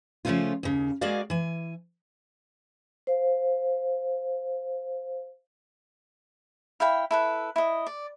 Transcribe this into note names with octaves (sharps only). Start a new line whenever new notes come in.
C#3 F3 F#3 A3 C#4 F4
D#2 C#3
G#3 A#3 F#4 G#4 D5 F5
E3 G#5
C5 F5
E4 F5 G5 B5
E4 A4 B4
E4 D#5
D5